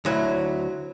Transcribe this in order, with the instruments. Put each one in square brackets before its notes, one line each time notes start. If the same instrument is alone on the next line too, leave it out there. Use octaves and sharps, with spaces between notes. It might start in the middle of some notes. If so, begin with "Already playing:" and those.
[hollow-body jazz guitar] D2 F#3 E4